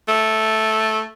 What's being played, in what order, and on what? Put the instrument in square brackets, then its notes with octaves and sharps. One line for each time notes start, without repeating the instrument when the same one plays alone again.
[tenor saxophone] A3